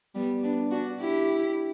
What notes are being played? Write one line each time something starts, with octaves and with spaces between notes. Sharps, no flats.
G3 B3
B3 D4
D4 F#4
E4 G4